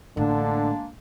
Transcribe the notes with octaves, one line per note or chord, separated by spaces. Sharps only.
A1 D3 G#3 A#3 D4